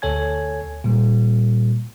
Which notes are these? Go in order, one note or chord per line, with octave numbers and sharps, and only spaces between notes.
D2 A4 C#5 G#5 G#6
A#2 G3